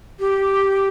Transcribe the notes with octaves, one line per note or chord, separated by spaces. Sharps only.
G4